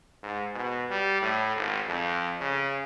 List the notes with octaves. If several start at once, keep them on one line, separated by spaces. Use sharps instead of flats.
G#2
B2
G3
A2
G#1
F2
C#3